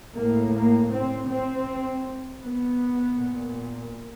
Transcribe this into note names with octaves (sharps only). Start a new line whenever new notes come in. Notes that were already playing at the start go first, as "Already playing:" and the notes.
A2 A#3
A#3
C4
C4
B3
A#2